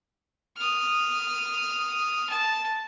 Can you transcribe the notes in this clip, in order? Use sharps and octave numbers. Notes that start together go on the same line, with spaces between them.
D#6 F6
A5